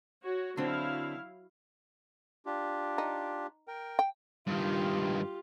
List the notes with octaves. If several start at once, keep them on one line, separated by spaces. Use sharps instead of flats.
F#4 C#5
D3 F#3 C4 D4 E4 F5
D4 F4 G4
D#4
A#4 G5
G5
G2 D#3 F4 G4